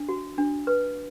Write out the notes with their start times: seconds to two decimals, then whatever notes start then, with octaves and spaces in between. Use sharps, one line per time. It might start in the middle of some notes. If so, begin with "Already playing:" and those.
Already playing: D4
0.09 F#4
0.38 D4
0.67 B4